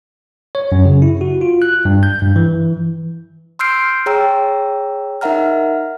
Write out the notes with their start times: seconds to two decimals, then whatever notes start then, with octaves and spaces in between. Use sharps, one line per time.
0.55 C#5
0.72 F#2
0.85 C#3
1.02 E4
1.21 F#4
1.41 F4
1.62 F#6
1.85 G2
2.03 G6
2.22 G2
2.36 E3
3.59 C6 E6 F6 G6 C7 D7
4.06 G#4 C#5 G5 A#5 E6
5.21 D#4 A#4 E5 F#5 A#5 F6